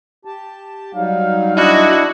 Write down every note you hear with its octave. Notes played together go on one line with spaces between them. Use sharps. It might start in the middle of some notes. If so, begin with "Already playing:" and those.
G4 A5
F#3 G3 D#4 F5
D4 E4 F#4 D#5